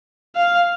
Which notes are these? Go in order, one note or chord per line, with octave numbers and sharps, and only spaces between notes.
F5